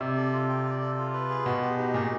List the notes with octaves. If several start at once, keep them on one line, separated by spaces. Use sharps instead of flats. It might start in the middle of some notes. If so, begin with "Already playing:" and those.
C3 D5
A4
F4
G5
D5
A4
F4
B4
G#4
B2 B3
G4
D#4
A#2 G#4